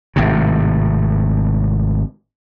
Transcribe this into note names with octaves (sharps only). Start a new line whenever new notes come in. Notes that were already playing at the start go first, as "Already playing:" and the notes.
G#1 A2 C3